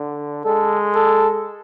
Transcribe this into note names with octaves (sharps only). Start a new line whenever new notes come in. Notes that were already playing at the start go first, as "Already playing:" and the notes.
Already playing: D3
G#3 A4
A4